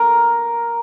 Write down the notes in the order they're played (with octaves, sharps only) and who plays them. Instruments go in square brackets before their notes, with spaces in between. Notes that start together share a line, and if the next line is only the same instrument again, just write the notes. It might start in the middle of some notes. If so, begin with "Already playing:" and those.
Already playing: [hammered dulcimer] A#4